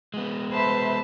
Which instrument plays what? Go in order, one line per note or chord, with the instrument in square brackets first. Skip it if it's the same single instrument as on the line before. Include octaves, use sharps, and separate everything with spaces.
[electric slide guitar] G#3 B3
[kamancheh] B4 B5 [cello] C5 E5 [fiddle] A5